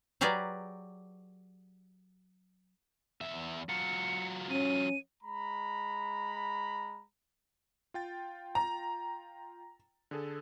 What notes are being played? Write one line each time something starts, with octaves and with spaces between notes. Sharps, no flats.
F#3 G4 G#4 A#4 B4 D5
E2 E5
F#3 F4 C#7
C#4 D#7
G#3 A#5 B5
F4 G5 A6
A#5
D3 G#4 A4